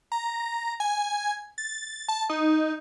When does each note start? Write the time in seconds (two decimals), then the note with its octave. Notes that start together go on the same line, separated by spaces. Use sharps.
0.12 A#5
0.80 G#5
1.58 A6
2.08 A5
2.29 D#4